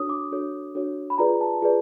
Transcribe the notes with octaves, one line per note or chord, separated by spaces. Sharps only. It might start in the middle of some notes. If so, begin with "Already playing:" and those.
Already playing: D4 F#4 A4 C#5 D#6
D6
D4 F#4 A4 C#5
D4 F#4 A4 C#5
B5
F4 G#4 B4 D5 A#5
A5
F4 G#4 B4 D5